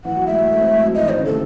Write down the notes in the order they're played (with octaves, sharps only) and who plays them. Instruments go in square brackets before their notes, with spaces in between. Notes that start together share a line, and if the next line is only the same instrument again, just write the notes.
[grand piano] E3 [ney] F#5
[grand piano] F#3
[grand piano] G#3 [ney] E5
[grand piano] G#3
A3
C4
G#3
F#3
[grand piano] E3 [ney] D#5
[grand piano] D#3 [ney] C5
[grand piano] C#3
[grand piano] C3 [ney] A4